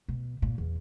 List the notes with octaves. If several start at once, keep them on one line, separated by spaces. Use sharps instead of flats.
B2
A#2
E2